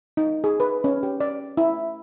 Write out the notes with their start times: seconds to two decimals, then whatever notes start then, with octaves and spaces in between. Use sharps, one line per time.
0.17 D#4
0.44 G#4
0.60 B4
0.84 C#4
1.03 G4
1.20 D5
1.57 E4